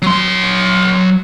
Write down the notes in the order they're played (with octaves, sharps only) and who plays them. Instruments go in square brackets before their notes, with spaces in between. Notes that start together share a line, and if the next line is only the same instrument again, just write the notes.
[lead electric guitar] F#3 C6